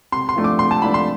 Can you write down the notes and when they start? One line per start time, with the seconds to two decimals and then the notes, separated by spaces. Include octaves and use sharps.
0.12 C3 C6
0.29 C6
0.36 F3 A3 D4
0.44 D6
0.59 C3 C6
0.71 A5
0.82 F3 A3 D4 B5
0.94 C6